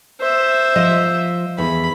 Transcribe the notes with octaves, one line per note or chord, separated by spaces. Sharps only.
C5 E5
F3 D#5
E2 B5